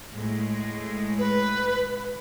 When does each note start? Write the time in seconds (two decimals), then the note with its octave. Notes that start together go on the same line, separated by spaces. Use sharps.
0.13 A2 G#3
1.18 B4